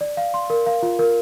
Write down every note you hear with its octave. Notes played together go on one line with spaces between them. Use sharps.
D5
F5
C6
A#4
F5
F4
A#4